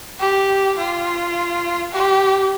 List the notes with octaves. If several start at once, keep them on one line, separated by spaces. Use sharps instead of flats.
G4
F4
G4